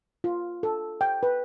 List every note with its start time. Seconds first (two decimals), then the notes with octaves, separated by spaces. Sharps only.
0.24 F4
0.63 A4
1.01 G5
1.23 B4